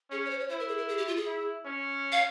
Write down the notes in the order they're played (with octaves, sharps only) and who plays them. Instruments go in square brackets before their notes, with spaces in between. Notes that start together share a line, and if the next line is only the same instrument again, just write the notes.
[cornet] C#4 [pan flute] G#4
[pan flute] C#5
C5
C#5
[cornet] E4 [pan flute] C5
[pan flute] A#4
G#4
A#4
G#4
G4
F4
G#4
[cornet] E4
C#4
[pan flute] F5